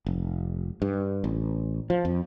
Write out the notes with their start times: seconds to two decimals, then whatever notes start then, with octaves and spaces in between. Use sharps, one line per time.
0.06 F1
0.82 G2
1.24 A1
1.90 F3
2.05 F2